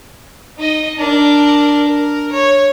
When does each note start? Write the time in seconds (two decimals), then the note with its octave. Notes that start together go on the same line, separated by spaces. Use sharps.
0.58 D#4 D#5
0.98 D4 A#4
1.87 A#4
2.32 C#5